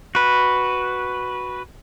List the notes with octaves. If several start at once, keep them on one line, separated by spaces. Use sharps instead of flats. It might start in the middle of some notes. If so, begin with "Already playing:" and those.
F#4 B4